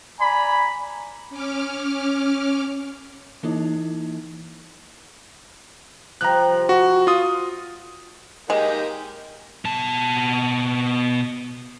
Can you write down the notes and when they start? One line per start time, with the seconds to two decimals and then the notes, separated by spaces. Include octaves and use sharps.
0.20 D5 G#5 A#5 B5
1.30 C#4 D6 F6
3.43 E3 A#3 D#4 E4
6.21 C3 F3 F4 A#5 F#6
6.69 F#4
7.07 F4 D#6
8.50 G#3 A#3 D#4 G4
9.65 B2 A5